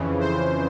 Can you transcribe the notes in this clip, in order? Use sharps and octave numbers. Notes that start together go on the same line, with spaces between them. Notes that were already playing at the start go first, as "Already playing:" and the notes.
Already playing: F2 C#3 E3
C5